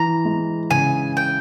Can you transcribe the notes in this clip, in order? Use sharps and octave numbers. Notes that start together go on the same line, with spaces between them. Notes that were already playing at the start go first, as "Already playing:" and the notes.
Already playing: E3 A#5
G#3
C#3 G#5
G5